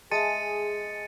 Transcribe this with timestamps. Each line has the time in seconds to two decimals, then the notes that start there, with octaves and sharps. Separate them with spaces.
0.11 G#3 G#4 E5 G#5 A5 A6 C#7 D#7